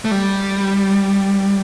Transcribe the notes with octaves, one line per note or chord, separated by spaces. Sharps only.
A3
G3